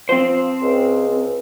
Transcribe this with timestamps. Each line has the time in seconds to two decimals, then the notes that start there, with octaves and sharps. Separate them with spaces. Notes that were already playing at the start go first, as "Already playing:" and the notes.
0.09 F3 C4 C5
0.61 C#2